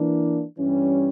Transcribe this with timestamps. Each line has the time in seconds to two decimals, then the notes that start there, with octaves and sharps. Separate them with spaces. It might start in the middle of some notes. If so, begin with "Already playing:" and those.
Already playing: E3 A#3 D4
0.58 G2 E3 G3 C#4